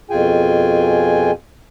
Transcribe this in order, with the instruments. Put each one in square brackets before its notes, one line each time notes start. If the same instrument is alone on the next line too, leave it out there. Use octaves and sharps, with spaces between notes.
[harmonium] F2 B2 F4 G#4 G5 G#5